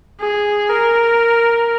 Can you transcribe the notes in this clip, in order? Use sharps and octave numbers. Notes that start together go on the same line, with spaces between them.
G#4
A#4